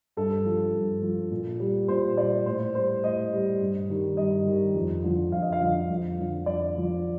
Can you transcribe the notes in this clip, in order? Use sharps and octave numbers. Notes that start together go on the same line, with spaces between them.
G2 A4
F3
G2
F3
A#2
G3
A#2 C5
G3 D5
A2 C5
G3 C5
A2 D#5
G3
G2
D#3 G3
G2 D#5
D#3 G3
F2
D3 F3
F2 F5
D#5
F5
D3 F3
F2
D3 F3
F2 D5
D3 F3